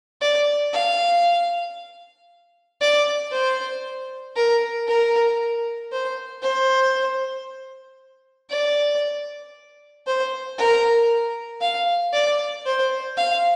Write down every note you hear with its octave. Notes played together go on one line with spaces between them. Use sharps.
D5
F5
D5
C5
A#4
A#4
C5
C5
D5
C5
A#4
F5
D5
C5
F5